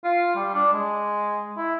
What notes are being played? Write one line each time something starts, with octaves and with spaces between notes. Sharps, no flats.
F4
G3
D4
G#3
E4